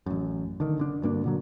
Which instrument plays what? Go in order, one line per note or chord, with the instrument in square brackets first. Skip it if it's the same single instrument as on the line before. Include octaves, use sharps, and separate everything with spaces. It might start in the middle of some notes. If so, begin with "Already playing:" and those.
[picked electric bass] A1 F#2
D3 D#3
F#1 D3 D4
D2 G2 A#3 D4
A#2 D3 F#3